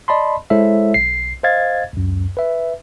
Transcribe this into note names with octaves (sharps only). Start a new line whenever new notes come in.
D5 D#5 A5 B5 C6
G#3 E4 A4 C5 C#5 E5
B1 C7
C5 D#5 F5 G#6 A6
C#2 F#2
B4 E5